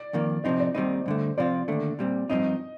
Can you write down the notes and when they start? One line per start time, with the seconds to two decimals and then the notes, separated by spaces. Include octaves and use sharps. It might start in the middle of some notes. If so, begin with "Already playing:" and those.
Already playing: D5
0.13 F2 D#3 A#3
0.44 C3 F3 C4 D#4 D#5
0.60 D5
0.75 D#2 D#3 G3 C4 D#4 C5
1.06 G2 D3 A3
1.38 C3 F3 C4 F4 D5
1.68 D#2 D3 A3
1.99 A#2 G3 C4
2.29 G2 F3 C4 D#4 D#5